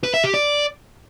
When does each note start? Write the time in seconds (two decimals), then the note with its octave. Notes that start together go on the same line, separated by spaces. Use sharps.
0.04 B4
0.14 E5
0.24 G4
0.34 D5